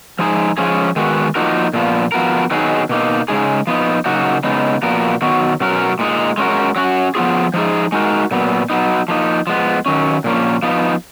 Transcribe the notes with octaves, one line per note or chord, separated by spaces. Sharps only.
F3 G#3 D#4 G#4
F3 G#3 C#4 G#4
D#3 G#3 B3 F#4
F3 A#3 D#4 F#4 A#4
A#2 F3 B3
F3 B3 F#4 A#4
D#3 F#3 B3 D#4 G#4
B2 A#3 D#4
C#3 G#3 D#4 G#4
F3 B3 D#4
C#3 F#3 A#3 D#4 F#4
C#3 G#3 B3 D#4
A#2 F3 B3 F#4 A#4
D#3 F#3 B3 F#4
B2 F#3 C#4 F#4 A#4
A#2 G#3 D#4
G#3 C#4 F#4 A#4
F#3 C#4 F#4
F3 B3 F4 G#4
F3 G#3 D#4 G#4
G#3 D#4 F#4 A#4
A#2 F#3 B3
F#3 B3 D#4
F3 A#3 D#4
F3 G#3 B3
D#3 F#3 C#4
A#2 F3 A#3 C#4
F3 B3 D#4